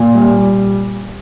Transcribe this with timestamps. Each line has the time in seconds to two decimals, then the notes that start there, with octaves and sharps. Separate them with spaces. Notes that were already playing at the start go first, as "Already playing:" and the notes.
Already playing: A#2
0.15 G3